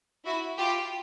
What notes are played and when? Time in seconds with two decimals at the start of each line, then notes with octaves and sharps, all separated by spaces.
0.25 E4 F#4
0.58 F4 G4